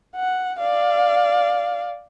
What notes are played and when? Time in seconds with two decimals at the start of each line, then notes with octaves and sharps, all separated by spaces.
0.16 F#5
0.59 D5 F5